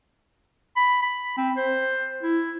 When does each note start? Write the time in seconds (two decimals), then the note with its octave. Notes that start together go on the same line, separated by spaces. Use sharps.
0.76 B5
1.02 B5
1.37 C4
1.57 C5
2.23 E4